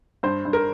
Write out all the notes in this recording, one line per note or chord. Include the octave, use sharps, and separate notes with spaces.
G2 C5
G2
A#4